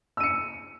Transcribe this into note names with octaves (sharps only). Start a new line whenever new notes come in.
E6 C#7 D#7